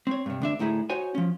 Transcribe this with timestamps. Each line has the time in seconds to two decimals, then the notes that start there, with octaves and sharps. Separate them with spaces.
0.07 C4 C#5
0.26 G2 C3
0.42 D2 D4 E5
0.59 D2 A2 D#4 E4 G#4
0.90 D#4 F#4 C5 C#5 G#5
1.15 F3 C#4